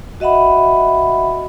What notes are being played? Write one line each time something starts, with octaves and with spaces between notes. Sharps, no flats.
F#4 D#5 E5 F#5 B5